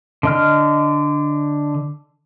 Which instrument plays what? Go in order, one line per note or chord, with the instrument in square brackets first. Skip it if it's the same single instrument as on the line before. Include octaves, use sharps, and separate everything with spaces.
[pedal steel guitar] D3 D#5 F6